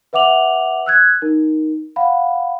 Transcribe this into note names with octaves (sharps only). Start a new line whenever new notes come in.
B4 E5 F#5 D6 F7 F#7
E6 F#6 G#6
D#4 A#4
F5 F#5 B5